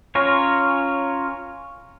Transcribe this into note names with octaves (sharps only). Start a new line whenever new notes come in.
C#4 F4 A#4 C#5